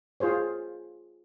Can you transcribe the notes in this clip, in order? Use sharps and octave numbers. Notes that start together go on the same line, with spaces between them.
F4 G#4 C5 C#5